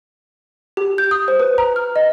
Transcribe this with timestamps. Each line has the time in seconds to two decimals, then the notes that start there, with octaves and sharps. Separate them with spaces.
0.77 G4
0.98 G6
1.11 D#6
1.28 C5
1.40 B4
1.58 A#5
1.76 F6
1.96 D#5